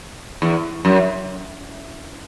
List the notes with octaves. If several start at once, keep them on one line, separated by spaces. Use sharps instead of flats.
E2
F#2